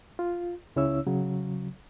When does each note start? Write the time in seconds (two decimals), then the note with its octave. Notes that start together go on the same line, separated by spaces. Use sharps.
0.19 F4
0.76 C#2 C#3 C#4 E4 C#5 E6
1.06 C#3 F#3